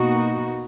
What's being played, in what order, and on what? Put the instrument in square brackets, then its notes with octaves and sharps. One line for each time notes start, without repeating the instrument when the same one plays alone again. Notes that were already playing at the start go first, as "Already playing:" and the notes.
Already playing: [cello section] B2 A#3 D#4 F#4